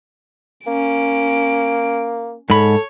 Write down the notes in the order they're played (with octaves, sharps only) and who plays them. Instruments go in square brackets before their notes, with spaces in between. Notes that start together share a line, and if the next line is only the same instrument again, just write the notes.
[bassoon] A#3 [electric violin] C#4 D7
[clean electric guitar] G#2 B5 [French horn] A4 [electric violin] C#5